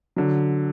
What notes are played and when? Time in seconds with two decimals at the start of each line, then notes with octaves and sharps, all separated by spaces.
0.16 D3 F#3